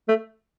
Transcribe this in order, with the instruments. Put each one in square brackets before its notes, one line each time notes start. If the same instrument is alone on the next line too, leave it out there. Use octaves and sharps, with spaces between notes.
[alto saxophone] A3